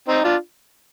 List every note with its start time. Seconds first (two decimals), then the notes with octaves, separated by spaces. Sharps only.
0.08 C4 D#4
0.24 D4 F4